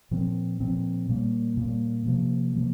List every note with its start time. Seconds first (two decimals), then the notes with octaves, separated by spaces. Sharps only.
0.11 A#2 F3 C4
0.60 A#2 F3 C4
1.09 A#2 G3 A#3
1.57 A#2 G3 A#3
2.07 C3 F3 A#3
2.56 C3 F3 A#3